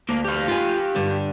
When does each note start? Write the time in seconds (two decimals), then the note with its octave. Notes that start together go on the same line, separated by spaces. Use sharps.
0.09 D2 A#3
0.24 G4 F5
0.48 F4 G#5
0.95 G2 D3